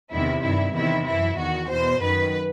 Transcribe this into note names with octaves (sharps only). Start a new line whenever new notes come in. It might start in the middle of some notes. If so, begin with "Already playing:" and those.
E2 C3 D#3 E4
G2 D#3 E4
E2 C3 D#3 E4
F#2 E3 E4
E2 D#3 F#4
E2 B2 C5
F#2 D#3 B4